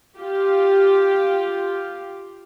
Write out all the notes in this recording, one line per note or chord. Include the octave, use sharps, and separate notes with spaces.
F4 G4